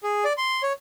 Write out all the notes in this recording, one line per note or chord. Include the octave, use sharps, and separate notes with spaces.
G#4
D5
C6
C#5